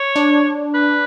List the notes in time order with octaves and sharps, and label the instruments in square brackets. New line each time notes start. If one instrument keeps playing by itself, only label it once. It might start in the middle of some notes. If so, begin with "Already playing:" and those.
Already playing: [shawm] C#5
[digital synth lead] D4
[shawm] B4